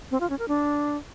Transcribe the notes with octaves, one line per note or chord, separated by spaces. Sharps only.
C4
F4
C#4
A#4
D4